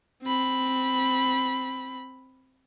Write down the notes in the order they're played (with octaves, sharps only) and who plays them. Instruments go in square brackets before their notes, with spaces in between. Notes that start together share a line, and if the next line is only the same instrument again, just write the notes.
[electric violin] C4 B5